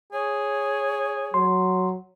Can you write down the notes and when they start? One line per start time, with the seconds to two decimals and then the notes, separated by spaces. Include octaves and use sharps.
0.13 G#4 C#5
1.34 F#3 C6